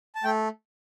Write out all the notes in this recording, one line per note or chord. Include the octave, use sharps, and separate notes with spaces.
A5
A3 G5